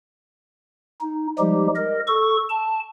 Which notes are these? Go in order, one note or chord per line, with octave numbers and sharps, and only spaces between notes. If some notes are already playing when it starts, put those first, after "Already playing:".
D#4
F3 G3 G#3 D#4 G4
A#4 D#5
A4 C#6
A5